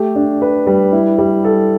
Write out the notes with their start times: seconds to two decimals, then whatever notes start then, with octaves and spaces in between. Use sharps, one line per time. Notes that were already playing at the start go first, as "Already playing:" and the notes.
Already playing: A3 G4
0.16 D4
0.42 B4
0.67 G3
0.92 E4
1.18 G3
1.44 A4